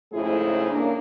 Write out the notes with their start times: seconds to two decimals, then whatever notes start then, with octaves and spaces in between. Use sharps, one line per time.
0.13 F2 G#2 C#3 A3 E4 G#4
0.70 A#3 C#4 D4